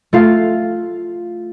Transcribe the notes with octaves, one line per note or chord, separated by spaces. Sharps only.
A3 F4 F5